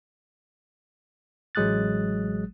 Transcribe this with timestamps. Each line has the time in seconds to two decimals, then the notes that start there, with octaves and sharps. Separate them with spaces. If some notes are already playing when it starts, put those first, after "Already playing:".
1.55 A1 F#3 G#3 D#6 F#6 A6